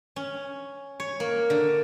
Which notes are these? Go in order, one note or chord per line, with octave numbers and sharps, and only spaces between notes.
C#4
C#5
A#3
D3